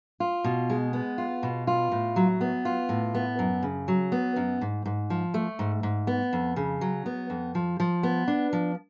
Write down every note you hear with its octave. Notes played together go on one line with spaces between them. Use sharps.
F4
B2
G#3
B3
F4
B2
F4
A2
F#3
B3
F4
A2
B3
F#2
C#3
F#3
B3
F#2
G#2
G#2
F3
A3
G#2
G#2
B3
F2
C#3
F#3
B3
F2
F3
F3
B3
D4
F3